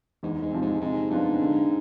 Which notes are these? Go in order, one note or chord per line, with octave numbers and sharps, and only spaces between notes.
E2 G#2
G#2
C3 F3
G#2
G#2 C3
G#2 F3 B3 D4 F4
D3